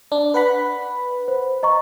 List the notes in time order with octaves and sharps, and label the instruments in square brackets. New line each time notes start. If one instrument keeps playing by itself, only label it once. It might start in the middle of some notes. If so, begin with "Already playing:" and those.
[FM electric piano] D4
B4 F#5 B5
[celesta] C5
D#5 A#5 C#6